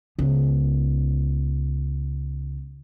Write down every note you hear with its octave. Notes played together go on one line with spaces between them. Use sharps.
C#2 B3